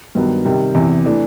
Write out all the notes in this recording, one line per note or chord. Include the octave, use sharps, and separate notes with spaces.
G2 D#3 F#3 B3
C3 D#3 G3
E2 C3 E3
E3 A3 D4